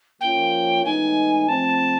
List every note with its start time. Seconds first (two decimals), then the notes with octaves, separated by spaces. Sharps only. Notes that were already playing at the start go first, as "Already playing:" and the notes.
0.21 F3 A#3 C#4 F4 G5
0.84 A2 E3 G#3 B3 D#4 G#5
1.49 F3 A3 C4 A5